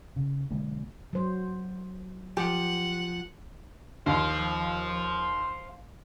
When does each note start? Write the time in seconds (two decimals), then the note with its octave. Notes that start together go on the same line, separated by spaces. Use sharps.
0.16 C#3
0.51 B1 D3 G#3 A#3
1.13 F#3 C5
2.37 F3 G4 F#5
4.06 D#2 C5 F5